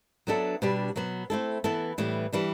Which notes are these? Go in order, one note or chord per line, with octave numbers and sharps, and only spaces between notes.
F#3 B3 D4 A4 E5
B2 G3 D4 G4
B2 F#3 B3
A3 C4 E4 A4
E3 B3 E4 A4
A2 E3 G3 B3
E3 G3 D4